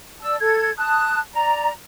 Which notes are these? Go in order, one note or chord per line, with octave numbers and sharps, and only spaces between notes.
D5 A5 E6
A4 G#6
A5 D#6 F#6
D5 A#5